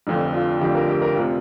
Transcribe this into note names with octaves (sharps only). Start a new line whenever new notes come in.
F1 F2 D3 D4
F4
F1 F2 D3 G4
A#4
G4
A#4
F1 C3 F4